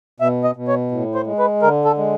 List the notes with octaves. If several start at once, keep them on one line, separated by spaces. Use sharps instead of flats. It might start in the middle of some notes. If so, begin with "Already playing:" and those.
B2 E5
D#5
B2
C#5
A2
C5
G#3
B4
D3 A#4
A4
G#3